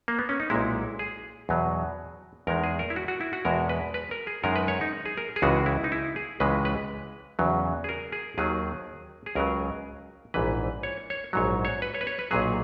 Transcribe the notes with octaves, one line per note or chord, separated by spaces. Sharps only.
A#3
B3
C#4
D#4
B1 A#2 G#3 E4
G#4
E2 B2 F#3
E2 D#3 G#3 A#4
G#4
A#4
E4
F#4
F#4
E4
F#4
E2 B2 G#3 A#4
B4
B4
A#4
G#4
F#2 D#3 G#3 A#4
B4
C#5
D#4
G#4
A#4
G#4
C#2 C#3 E3 G#3 F#4
E4
D#4
E4
G#4
C#2 C#3 E3 G#3 B4
B4
E2 C#3 F#3
G#4
A#4
G#4
D#2 D#3 F#3 G#4
G#4
C#2 C#3 F#3 A#4
A#1 G#2 E3 B4
C#5
C#5
A#1 G#2 F#3 C#5
C#5
B4
C#5
B4
C#5
B4
B1 A#2 F#3 G#4